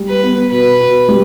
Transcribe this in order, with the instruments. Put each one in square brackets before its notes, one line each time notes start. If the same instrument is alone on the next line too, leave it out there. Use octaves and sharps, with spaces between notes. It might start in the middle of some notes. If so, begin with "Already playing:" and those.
Already playing: [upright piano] G3
[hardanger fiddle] B4
[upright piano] B3
[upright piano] B2 [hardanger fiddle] B4
[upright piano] B2
G3